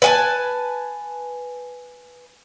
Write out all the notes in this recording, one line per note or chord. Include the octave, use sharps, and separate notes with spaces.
B4 G#5 A5